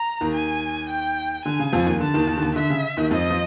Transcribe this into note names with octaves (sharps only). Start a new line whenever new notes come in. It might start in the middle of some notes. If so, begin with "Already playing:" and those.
Already playing: A#5
D#2 D#3
G#5
G5
D3 G#5
C#3
F2 F3
D#2 D#3
D3 A5
D#2 D#3
D#2 D#3
D3
D#2 D#3
D3 E5
C#3
D#2 D#3
F2 F3 D#5
F3